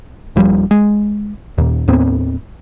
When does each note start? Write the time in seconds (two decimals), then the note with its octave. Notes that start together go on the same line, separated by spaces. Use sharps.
0.36 D#1 F3 G3
0.71 G#3
1.58 D#2 A#2
1.88 D#2 A2 B3 C4